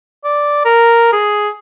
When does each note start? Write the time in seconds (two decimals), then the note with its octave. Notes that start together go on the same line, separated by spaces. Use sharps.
0.24 D5
0.65 A#4
1.12 G#4